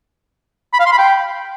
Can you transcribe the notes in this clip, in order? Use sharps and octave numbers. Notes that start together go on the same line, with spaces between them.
B5
F5
C6
B5
G5